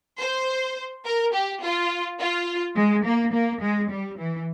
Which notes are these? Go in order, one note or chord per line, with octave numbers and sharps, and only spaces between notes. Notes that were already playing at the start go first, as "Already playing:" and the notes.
C5
A#4
G4
F4
F4
G#3
A#3
A#3
G#3
G3
E3